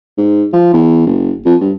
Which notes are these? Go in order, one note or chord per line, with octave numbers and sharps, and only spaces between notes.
G#2
F3
E2
F#1
F2
G2